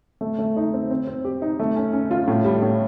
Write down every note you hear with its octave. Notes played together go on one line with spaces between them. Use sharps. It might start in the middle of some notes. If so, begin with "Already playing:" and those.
A3
A3
D#4
C4
C4
C4
G4
D#4
A3
C#4
C#4
F4
A2
G3
A2